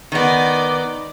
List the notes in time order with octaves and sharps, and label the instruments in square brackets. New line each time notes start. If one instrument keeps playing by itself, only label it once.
[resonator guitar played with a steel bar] D#3 B3 [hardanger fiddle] D5 D#5